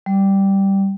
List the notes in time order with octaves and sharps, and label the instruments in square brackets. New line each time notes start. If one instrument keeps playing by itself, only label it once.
[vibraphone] G3